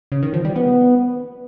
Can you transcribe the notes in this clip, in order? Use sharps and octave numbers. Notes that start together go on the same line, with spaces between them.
C#3
D#3
F3
G3
B3